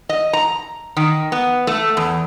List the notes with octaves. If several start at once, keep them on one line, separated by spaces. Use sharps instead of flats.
D#5
A#5
D#3
B3
A3
E2